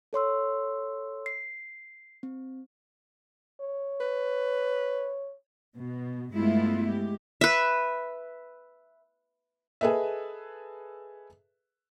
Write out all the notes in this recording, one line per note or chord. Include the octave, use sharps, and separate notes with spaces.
A4 C#5 C6 E6
C7
C4
C#5
B4
B2
G2 G#3 A3 B3 E4 F4
G#3 G4
B4 E5
G#4 A4 B4 D#5 E5